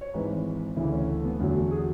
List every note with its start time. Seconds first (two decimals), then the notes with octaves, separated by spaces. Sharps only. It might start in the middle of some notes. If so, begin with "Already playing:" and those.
0.01 C#5
0.14 G#1 G#2 E3 B4
0.76 D2 C#3 E3 E4
0.92 C#4
1.09 A3
1.24 B3
1.39 E2 D3 F#3 A3
1.56 F#4
1.71 G#4